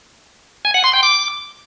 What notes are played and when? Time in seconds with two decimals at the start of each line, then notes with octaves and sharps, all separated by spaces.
0.65 G#5
0.74 F#5
0.84 C6
0.93 G5
1.03 D6